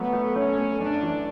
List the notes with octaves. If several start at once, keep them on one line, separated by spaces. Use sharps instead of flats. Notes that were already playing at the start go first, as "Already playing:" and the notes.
Already playing: F#3 A3 B3
A3
A3 C#4
A3
F#2 D4
E3